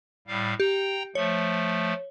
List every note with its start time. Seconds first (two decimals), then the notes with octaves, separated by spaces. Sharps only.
0.27 A2 G3 F5
0.60 G4 G5 A#5
1.15 F3 A3 C#5